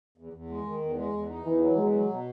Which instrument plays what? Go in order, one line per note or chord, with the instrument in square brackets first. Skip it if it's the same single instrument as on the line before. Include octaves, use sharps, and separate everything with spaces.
[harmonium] E2
E2
G#3
D#3
E2
G#3
E2
D#4
[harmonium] E2 [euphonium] E3
[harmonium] F#3
[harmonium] E2 [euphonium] G#3
[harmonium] F#3
B2